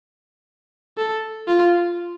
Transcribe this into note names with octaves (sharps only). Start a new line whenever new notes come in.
A4
F4